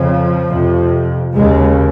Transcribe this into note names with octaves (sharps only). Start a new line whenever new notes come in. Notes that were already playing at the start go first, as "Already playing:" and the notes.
Already playing: F2 C#3 F3
F2 C3
D#2 C#3 G#3